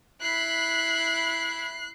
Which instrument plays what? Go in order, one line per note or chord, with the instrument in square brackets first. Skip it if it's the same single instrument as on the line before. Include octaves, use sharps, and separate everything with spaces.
[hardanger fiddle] E4 B5 [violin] F#6 C7